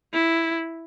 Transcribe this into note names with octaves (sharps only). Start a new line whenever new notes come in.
E4